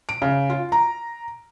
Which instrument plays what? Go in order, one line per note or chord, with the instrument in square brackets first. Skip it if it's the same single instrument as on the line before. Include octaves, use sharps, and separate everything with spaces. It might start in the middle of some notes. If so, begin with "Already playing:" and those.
[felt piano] D7
C#3
F4
A#5